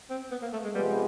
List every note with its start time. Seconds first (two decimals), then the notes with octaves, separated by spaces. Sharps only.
0.10 C4
0.31 B3
0.42 A#3
0.53 A3
0.64 G#3
0.74 C3 F3 G3 G#3 B3